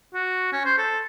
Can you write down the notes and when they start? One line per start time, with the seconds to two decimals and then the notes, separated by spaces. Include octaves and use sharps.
0.14 F#4
0.52 C#4
0.65 C5
0.78 A4